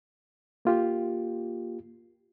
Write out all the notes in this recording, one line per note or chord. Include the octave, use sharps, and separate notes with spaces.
A#3 F4 G4